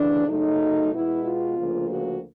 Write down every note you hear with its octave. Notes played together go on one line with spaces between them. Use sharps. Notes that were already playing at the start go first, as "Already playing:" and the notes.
Already playing: D2 C#3 E3 D4
F#2 C#3 F#3 A3 D#4
B2 G#3 B3 E4
F4
D2 C#3 F3 A#3
F#4